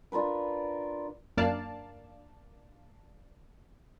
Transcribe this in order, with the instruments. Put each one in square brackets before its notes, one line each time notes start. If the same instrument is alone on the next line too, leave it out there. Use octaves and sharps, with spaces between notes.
[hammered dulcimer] D4 F4 A#4 B4
[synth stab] F#2 A#3 D4 D5 F5 A5